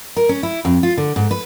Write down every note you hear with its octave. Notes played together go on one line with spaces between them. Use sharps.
A#4
C#4
E4
F2
F4
D3
G#2
B4